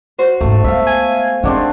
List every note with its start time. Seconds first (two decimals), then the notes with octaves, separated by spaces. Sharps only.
0.19 F#4 C5
0.41 D#2 G#2 A3
0.64 G#3 B3 E5 F5
0.87 G#5
1.43 D#3 G#3 C4 D4 F#4